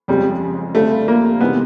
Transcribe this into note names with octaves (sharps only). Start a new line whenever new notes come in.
F2 C#3 F3 G3 G#3 C4
D3 G3 A3 C4 F4
A#3
C3 E3 G#3 B3 C4 D#4